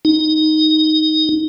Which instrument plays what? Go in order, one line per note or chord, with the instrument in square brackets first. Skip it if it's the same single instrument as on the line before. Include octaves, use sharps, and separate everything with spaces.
[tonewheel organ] D#4